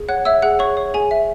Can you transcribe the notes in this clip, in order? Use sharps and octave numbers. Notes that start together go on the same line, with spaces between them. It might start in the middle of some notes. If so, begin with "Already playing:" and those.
Already playing: G#4
C#5 F#5 F#6
C#5 E5 E6
G#4 F#5 F#6
G#4 C#5 C#6
C#5
G#4 G#5
E5